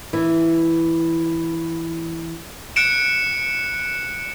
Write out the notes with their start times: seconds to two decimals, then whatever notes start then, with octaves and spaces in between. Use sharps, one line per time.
0.13 E3 E4
2.76 F#6 C#7 D7 E7